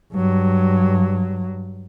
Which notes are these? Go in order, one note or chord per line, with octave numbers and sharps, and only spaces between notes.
G2 F#3